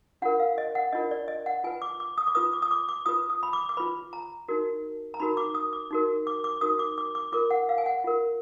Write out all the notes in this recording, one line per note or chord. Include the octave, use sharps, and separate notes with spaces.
D4 F4 A#4 F#5
F5
D#5
F#5
D4 F4 A#4 D#5
D5
D#5
F#5
F4 B4 G#5
D6
D6
D#6
D6
F4 B4 D#6
D6
D#6
D6
D6
F4 B4 D#6
D#6
B5
D6
D6
F4 B4 B5
A#5
D#4 F#4 A#4
A#5
D#4 F#4 A#4 B5
D6
D#6
D6
D#4 F#4 A#4
D6
D6
D#4 F#4 A#4 D#6
D6
D6
D6
F4 A#4 D6
F#5
F5
G#5
F#5
F4 A#4